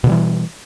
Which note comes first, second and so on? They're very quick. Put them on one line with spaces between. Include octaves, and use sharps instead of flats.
B2 D3 G3 E3